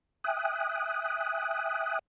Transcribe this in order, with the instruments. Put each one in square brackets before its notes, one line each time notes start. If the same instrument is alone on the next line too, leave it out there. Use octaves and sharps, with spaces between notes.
[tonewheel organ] E5 G5 G#5 D#6 F#6